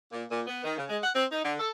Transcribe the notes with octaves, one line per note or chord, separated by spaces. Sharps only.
A#2
A#2
B3
D#3
C#3
G#3
F#5
C4
D#4
D3
A4